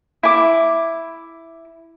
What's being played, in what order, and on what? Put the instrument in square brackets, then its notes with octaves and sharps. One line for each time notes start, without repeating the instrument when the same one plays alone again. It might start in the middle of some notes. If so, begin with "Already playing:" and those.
[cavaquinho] E4 D6